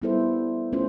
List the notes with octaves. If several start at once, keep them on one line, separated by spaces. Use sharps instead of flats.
G3 B3 E4 A4 C5
A3 C#4 F4 C5